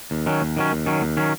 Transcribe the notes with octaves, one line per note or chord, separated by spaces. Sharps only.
D#2
D#3 F#3 C#4
D#2
D#3 F#3 C#4
D#2
D#3 F#3 C#4
D#2
D#3 F#3 C#4